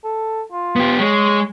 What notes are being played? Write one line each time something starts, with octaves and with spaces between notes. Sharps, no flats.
A4
F4
B3 G4
G#3 C#5